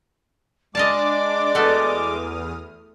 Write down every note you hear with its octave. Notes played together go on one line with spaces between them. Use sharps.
G#3 D4 D5 D#5 F5 A5 D6
E2 A3 F#4 A4 D#6 F6